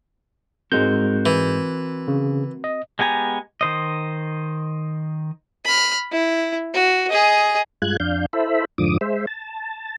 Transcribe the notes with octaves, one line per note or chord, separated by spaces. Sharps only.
G#2 G#3 C4 F#4 A#4 G6
E3
C#3
D#5
G#3 B3 G4 G#5 A#5
D#3 C5 D#5
B5 F6
E4
F#4
G#4 D#5
G2 G#3 F4 F#6 G#6
F2 D4 F5 G6
E4 A4 C5 E5 B5
F2 G#2 D3 F3 D6 D#6
G#3 C5 E5
A5